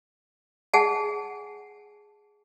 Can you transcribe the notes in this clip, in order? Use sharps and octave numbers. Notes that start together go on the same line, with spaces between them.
G#4 F#5 G#5 A5